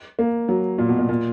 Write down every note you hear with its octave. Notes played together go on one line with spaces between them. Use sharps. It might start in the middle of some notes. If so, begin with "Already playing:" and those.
A#3
F#3
A#2
B2
A#2
A#2